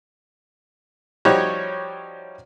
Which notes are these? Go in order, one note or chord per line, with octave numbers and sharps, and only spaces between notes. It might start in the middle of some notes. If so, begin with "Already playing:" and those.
F3 G3 D#4 F#4 G4 C#5